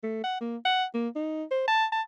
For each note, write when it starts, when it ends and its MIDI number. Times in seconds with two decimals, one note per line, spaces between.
0.03 0.23 57
0.24 0.36 78
0.41 0.57 58
0.65 0.85 78
0.94 1.08 58
1.16 1.44 63
1.51 1.66 72
1.68 1.86 81
1.92 2.02 81